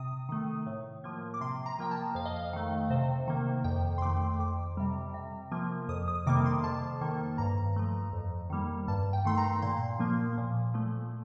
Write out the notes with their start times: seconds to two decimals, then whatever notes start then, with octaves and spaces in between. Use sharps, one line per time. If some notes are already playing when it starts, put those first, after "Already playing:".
Already playing: C3 D#6
0.29 D#3 A3
0.67 A2
1.04 F3 A#3
1.34 D6
1.41 C3 C6
1.66 A#5
1.79 F3 A#3 G5
1.91 A5
2.15 F2 F5
2.25 D#5
2.36 F5
2.53 D#3 A3
2.90 C3 C5
3.28 D#3 A#3
3.64 F2 G5
3.98 C6
4.02 D#3 A3 D6
4.39 F2 D6
4.77 C3 G3
5.14 C3
5.52 F3 A#3
5.88 F2 D#6
6.08 D#6
6.27 C3 D#3 G3 A#3 D6
6.46 C6
6.64 F2 A5
7.01 D#3 A#3
7.38 G2 A#5
7.76 F3 A3
8.13 F2
8.50 D#3 G3 A#3
8.88 G2 A5
9.13 G5
9.25 D#3 A3 C6
9.37 A#5
9.62 A#2 C6
10.00 F3 A#3
10.38 A#2
10.74 F3 A3